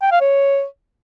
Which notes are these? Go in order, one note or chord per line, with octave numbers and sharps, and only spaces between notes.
G5
F5
C#5